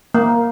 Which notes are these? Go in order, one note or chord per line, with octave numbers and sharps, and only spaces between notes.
A#3